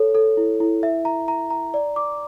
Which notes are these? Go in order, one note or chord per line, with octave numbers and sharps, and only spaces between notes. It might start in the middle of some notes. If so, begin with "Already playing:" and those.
Already playing: A4 C#5
A4
E4
E4
E5
A#5
A#5
A#5
D5
D6